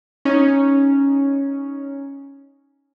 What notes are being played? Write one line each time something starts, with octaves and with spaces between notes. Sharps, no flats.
C#4 D#4